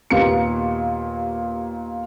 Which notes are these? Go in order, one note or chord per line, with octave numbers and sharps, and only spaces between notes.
D#2 A#2 A#3 B3 G4 C#7